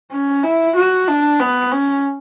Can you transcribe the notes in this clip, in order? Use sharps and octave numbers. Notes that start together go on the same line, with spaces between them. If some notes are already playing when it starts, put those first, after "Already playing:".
C#4
E4
F#4
D4
B3
C#4